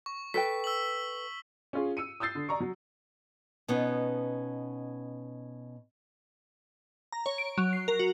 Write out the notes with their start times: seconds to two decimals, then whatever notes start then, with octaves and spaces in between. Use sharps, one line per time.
0.06 C#6
0.34 A4 B4 G5 B6
0.64 E6 F#7
1.73 C#4 F4 G#4
1.97 E6 C#7 D#7
2.20 D#6 E6 G6 A6 C7
2.35 D3
2.49 D5 A#5 C#6
2.60 F#3
3.68 B2 B3 C#4 D#4
7.12 A#5
7.26 C#5
7.38 D7
7.58 F#3
7.73 C7
7.88 A#4
7.99 F#4